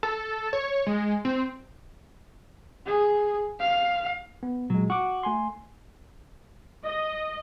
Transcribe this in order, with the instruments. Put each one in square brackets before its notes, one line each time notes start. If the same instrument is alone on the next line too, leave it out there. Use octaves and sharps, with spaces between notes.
[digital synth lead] A4
C#5
G#3
C4
[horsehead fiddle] G#4
F5
[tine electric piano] B3
[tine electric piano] A#2 G#3 [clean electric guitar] F#3
[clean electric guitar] F#4 [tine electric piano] C#6 D6
[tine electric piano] A3 G#5 C6
[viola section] D#5